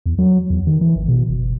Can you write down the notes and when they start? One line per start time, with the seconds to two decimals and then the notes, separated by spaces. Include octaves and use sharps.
0.06 E2
0.19 F#3
0.50 E2
0.67 D#3
0.81 E3
0.96 G#1
1.08 B2
1.29 F#1